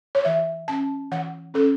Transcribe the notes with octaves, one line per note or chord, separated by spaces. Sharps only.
C#5
E3 E5
C#4 A5
E3 F#5
C#4 A4